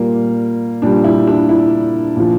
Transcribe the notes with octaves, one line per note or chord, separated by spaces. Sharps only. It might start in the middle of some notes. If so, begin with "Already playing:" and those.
Already playing: A#2 G3 A#3
A#2 G3 D4
E4
D4
E4
A#2 F3